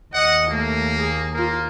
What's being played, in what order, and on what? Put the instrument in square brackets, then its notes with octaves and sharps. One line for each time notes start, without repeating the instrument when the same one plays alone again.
[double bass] D#2 [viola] D#5 [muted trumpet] F#5
[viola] A3 [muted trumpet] A#3
[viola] G#4
[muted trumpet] A#3 [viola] F4 A#4